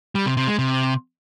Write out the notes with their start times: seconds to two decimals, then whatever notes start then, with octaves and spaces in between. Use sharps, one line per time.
0.15 G3
0.26 C3
0.37 C3
0.48 G#3
0.59 C3